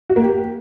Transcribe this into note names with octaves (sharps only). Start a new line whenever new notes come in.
F#4
A#3
G4